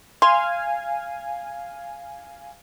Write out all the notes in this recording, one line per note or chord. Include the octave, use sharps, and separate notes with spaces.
F5 G#5 C6 G#6